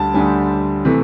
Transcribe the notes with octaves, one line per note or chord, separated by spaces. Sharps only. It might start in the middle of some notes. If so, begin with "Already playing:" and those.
Already playing: D2 D3 G3 A5
D2 D3 G3 G#5
C3 E3 A3